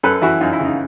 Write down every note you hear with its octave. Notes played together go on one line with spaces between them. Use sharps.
F#2 A4 B4
E3 E4 F#4
F#2 D#4 F4
E4
C#3
D#4